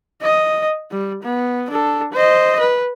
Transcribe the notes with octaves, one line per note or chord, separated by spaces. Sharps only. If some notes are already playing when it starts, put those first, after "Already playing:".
D#5
G3
B3
D4 A4
C5 D#5
B4